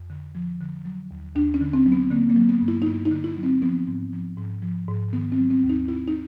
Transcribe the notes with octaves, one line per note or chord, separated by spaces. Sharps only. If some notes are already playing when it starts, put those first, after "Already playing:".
Already playing: F2
D3
F3
D3
F#3
D#2
D#2 D4
C#4
D3
C4
F#3
B3
D3 A#3
A#3
F#3
B3
G2
E4
D#4
G2 E4
D#4
D3
E4
F#3
C4
F3 B3
G#2
F3
G#2
F3
G#2
D#3 B3
C4
F#3
C4
D#2
D#4
D#2 E4
D#4